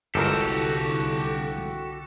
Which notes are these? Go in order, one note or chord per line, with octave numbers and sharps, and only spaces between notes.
G1 C2 D3 G#3 F#4 G4 A4 A#4